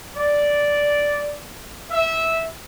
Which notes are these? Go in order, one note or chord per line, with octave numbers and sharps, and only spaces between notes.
D5
E5